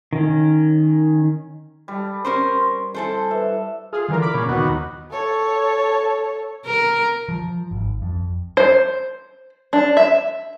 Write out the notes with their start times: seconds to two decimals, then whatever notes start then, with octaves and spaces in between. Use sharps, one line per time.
0.13 D#3 C#4
1.88 G3 A4
2.25 C#4 A#4 C5 C6
2.94 E4 A4 C5 G#5
3.31 B4 E5
3.93 F4 G#4
4.08 D3 E3 A#4
4.22 B5 D6
4.34 A#2 C#3
4.49 D#2 B3 F#4
5.11 A4 C#5
6.66 A#4
7.29 F3
7.71 G#1
8.02 F2
8.57 C5
9.73 D4
9.97 E5